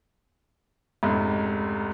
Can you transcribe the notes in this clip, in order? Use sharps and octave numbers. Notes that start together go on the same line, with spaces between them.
F1 C#2 G#2